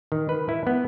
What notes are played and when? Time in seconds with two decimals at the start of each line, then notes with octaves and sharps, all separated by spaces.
0.12 D#3
0.29 B4
0.49 E4
0.67 B3